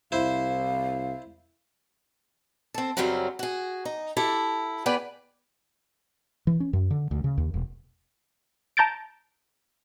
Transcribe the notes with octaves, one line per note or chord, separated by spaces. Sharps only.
C2 E4 C5 F5
C4 A4
F#2 C#3 F#3 G3 C4 C#4
F#4 G#4
D#4 D#5
E4 G4 A4
B3 G#4 B4 D5 G5
E3
C#4
F#2
D3
D2
C#3
D#2
E1
A5 A#5 G6 A6 D7